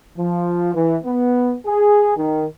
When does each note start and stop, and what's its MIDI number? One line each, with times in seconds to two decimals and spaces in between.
0.18 0.74 53
0.74 0.97 52
1.03 1.55 59
1.66 2.12 68
2.17 2.46 51